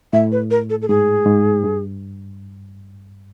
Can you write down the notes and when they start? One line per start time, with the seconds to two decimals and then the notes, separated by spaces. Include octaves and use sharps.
0.13 A2 E5
0.32 B4
0.51 A#4
0.70 A4
0.82 A4
0.88 G#2 G#4
1.26 G#2
1.64 G2